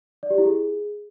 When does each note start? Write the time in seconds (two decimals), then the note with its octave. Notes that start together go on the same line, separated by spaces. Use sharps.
0.23 D5
0.30 G4
0.38 E4
0.46 G#4